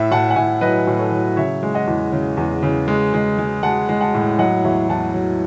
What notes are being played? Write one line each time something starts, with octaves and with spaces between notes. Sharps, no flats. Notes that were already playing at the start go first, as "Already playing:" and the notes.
Already playing: A2 E5
A2 F#5 A5
F#5
A2 E5 G#5
F#3 B4 D#5
A2
A4 C#5
F#3
C#3 C#5 E5
G#3
D#5 F#5
E2
C#3
E2
C#3
G#3
G#3
G#3
G#3 F#5 A5
G#3
F#5 A5
A2
F#3 D#5 F#5
E2 C#5 E5
E2 F#5 A5
F#3